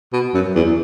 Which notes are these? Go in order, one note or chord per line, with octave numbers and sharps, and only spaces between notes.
B2
F#2
E2